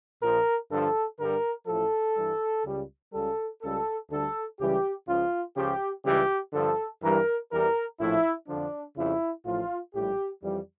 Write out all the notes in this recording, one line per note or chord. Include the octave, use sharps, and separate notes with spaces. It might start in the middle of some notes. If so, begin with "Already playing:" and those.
A#1 A#2 F3 A#4
G2 D3 F3 A4
G2 D3 G3 A#4
A1 A2 F3 A4
G2 E3 G3
C#2 C#3 G3
C#2 C#3 G3 A4
C#2 C#3 G3 A4
D2 D3 G3 A4
C#2 C#3 E3 G3 G4
C#2 C#3 F3 F4
C#2 C#3 F3 G4
C#2 C#3 E3 G3 G4
G2 D3 F3 A4
G2 E3 G3 A#4
E2 E3 G3 A#4
A#1 A2 F3 E4
F2 D3 F3 D4
F2 C#3 G3 E4
A1 A2 F3 F4
A#1 A2 G3 G4
F2 E3 G3